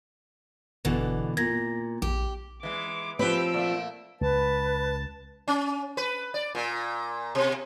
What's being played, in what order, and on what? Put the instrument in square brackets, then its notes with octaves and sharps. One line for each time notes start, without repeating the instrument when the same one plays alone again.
[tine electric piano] G1 [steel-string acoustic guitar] B2 D3 E3
[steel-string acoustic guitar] A#2 [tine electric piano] G#6 A#6
[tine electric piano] A#1 [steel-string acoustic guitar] G4
[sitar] E3 G#3 [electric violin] D6
[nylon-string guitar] F3 C4 [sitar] G4 B4 [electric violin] E6 D7
[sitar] A#2 A3
[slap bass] C#2 [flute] B4 [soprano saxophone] A5
[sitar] C#4
B4
D5
A#2
B2